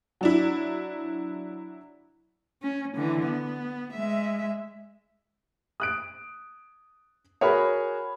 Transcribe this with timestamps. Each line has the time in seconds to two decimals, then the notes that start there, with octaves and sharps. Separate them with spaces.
0.21 F#3 D4 E4
2.62 C#4
2.96 D3 E3
3.26 B3
3.93 G#3 E5
5.80 D#6 F#6 D7
7.41 F#4 G#4 A#4 C#5 B5